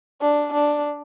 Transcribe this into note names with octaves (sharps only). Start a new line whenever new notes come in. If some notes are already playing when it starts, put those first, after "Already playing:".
D4
D4